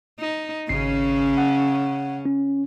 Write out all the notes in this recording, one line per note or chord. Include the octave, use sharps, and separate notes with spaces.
D#4
G#1 C#3 C#4 C7
F#5
C#4